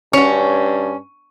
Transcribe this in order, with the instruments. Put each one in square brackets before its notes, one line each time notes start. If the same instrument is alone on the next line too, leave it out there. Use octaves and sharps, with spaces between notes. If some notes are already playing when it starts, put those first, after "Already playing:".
[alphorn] G2 [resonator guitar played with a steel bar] C#4 [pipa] F#4 C#5